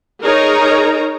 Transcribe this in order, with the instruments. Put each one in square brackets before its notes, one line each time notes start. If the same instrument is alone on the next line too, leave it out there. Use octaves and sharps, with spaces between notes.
[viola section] D#4 G#4 A#4 C#5 A#5